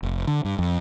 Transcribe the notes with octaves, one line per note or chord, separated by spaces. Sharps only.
F1
D3
G2
F2